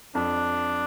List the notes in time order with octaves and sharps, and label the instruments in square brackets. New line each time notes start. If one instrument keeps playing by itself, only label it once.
[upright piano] F2 [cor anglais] D4